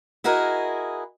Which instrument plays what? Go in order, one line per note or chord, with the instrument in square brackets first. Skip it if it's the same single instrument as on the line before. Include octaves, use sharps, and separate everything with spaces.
[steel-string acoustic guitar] E4 F#4 G#4 A#4 D#5